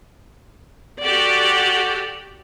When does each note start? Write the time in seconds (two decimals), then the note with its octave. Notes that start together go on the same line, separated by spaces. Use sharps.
1.02 F#4 G4 A4 D5